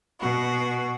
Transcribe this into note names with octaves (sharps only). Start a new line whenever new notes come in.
B2 F#4